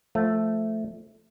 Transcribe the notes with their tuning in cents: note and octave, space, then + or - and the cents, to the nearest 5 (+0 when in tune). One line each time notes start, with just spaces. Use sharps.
F3 -5 A3 +0